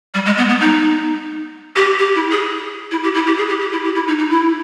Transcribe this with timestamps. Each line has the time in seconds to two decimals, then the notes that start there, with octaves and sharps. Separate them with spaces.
0.14 G3
0.26 G#3
0.38 B3
0.49 B3
0.61 D#4
1.76 G4
1.99 G4
2.15 E4
2.30 G#4
2.91 E4
3.04 G4
3.15 E4
3.27 G4
3.38 G#4
3.49 G4
3.61 G4
3.72 E4
3.84 G4
3.95 E4
4.08 D#4
4.18 D#4
4.30 E4